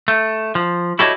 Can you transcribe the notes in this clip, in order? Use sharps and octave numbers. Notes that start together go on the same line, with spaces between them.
A3
F3
E4 F#4 G4 A4 C#5 D#5